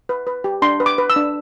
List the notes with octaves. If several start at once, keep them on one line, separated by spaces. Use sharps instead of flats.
B4
B4
G4
D4 C6
B4
D6
B4
E6
D4